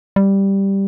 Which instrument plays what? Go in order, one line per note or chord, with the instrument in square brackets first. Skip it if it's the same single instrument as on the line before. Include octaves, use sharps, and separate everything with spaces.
[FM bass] G3